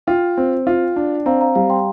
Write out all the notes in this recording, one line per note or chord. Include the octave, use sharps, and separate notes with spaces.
F4 G5
C4
F4
D4
C4 F5 A#5
F5 A#5
G3 F5 A#5
G5 C6